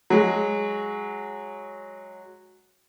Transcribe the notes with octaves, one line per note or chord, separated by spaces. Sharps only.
F#3 G#3